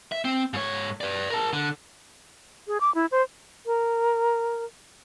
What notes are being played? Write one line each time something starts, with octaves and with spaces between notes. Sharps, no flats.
E5
C4
G#2 C#5
B4 D5
A#4 A5
D3
G#4
D6
E4
C5
A#4